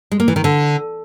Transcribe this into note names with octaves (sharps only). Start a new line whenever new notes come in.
G#3
A#3
E3
D#3
D3